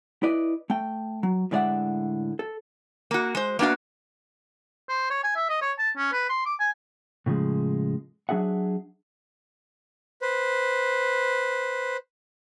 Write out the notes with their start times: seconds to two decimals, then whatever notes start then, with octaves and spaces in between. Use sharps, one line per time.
0.23 E4 B4 D5 D#5
0.70 A3 G5
1.23 F#3
1.51 A2 D3 G#3 D5 E5 F#5
2.39 A4
3.11 A#3 F#4
3.35 G#3 C5
3.59 A#3 B3 D4 F#4 F5
4.89 C5
5.10 C#5
5.24 G#5
5.36 E5
5.49 D#5
5.62 C#5
5.79 A5
5.97 C#4
6.13 B4
6.29 C6
6.46 D6
6.60 G#5
7.26 A2 C#3 F3 G#3
8.29 F#3 D4 G#4 E5 F#5
10.22 B4 C5